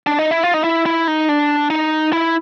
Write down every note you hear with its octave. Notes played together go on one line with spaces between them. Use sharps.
D4
D#4
E4
F4
D#4
E4
E4
D#4
D4
D#4
E4